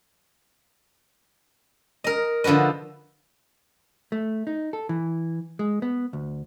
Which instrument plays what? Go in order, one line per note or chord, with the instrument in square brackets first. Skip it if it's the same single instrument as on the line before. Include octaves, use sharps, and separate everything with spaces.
[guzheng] A#4 D#5
D3 F3 F#4 B4 D#5
[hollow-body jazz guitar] A3
D#4
A4
E3
G#3
B3
D2